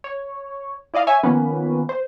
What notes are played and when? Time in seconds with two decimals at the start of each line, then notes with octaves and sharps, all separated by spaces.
0.04 C#5
0.94 E4 D5 D#5 F5
1.07 C#5 E5 G#5
1.23 D#3 F3 A#3 B3 C#4 B4
1.89 C5